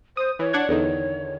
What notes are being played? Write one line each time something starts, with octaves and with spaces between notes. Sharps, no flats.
C5 D#6
E3 C#5
D4 F#5 G#6
E2 D3 D#3